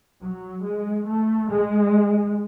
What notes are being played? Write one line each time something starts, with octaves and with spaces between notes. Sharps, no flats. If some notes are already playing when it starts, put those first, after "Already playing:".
F#3
G#3
A3
G#3